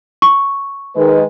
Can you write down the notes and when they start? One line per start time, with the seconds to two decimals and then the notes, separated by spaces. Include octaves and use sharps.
0.22 C#6
0.96 D#3 G#3 B4